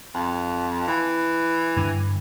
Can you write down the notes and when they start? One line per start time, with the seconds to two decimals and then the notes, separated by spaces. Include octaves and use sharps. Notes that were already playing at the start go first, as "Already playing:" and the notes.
0.15 F2
0.87 E3
1.77 G2 D3